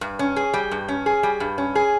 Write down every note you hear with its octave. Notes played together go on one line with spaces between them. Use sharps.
G2
C#4
G#4
G3
G2
C#4
G#4
G3
G2
C#4
G#4